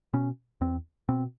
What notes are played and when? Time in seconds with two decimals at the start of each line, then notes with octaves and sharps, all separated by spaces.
0.13 B2 C#4
0.61 E2 C4
1.09 B2 C4